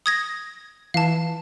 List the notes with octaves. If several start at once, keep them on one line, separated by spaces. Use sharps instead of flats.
D#6 G#6 A#6
E3 F5 A5